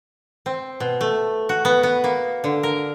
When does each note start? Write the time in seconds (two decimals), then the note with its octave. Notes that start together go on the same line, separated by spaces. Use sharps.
0.46 C4
0.80 B2
1.01 A3
1.49 F#4
1.65 B3
1.83 B3
2.04 A#3
2.44 D3
2.63 A#4